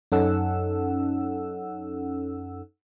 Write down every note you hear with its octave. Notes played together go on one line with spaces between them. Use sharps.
F#2 C#4 D#4 A4 F#5 E6